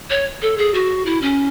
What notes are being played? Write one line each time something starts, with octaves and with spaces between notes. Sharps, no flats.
C#5
A4
G#4
F#4
E4
C#4